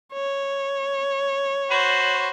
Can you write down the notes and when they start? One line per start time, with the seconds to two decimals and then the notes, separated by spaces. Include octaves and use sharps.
0.13 C#5
1.71 F#4 B4 C5